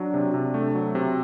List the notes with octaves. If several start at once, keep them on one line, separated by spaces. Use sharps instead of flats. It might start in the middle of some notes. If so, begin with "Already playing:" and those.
Already playing: F#3 D4
C3
C3
A3
F#3
C3